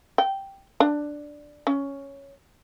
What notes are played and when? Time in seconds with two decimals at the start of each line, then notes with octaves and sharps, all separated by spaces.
0.18 G5
0.80 D4
1.67 C#4